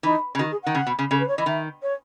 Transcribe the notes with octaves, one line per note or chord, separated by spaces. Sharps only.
E3 D#4
C#3
D#3 F#4
G#4
D#3 F#5
C#3
B2
C#3
C#3 A4
B4
C#5
E3 D#5
D#3 E5
C#5